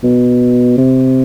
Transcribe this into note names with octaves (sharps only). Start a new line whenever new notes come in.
B2
C3